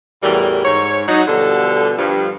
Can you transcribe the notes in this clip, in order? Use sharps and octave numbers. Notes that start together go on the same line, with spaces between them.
E2 A2 E3 G3 F#4 A#4
G#2 C#5
F#3 D#4
B2 D3 F3 G3 A4
G2 F3